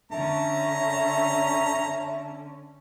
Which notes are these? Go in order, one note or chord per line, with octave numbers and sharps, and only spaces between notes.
D3 C#4 E5 A5 A#5